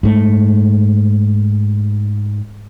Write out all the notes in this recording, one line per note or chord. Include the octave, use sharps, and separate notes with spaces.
G#2 A3